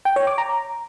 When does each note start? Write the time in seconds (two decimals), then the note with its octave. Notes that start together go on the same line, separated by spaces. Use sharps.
0.05 G5
0.16 C#5
0.27 D6
0.38 A#5